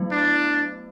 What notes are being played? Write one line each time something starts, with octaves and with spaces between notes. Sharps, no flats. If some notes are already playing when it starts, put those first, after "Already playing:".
Already playing: F#3 A3 B3 E4
D4